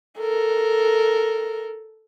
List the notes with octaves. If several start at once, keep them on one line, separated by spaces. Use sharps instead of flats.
A4 A#4